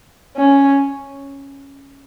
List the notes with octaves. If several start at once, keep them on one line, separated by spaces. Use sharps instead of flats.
C#4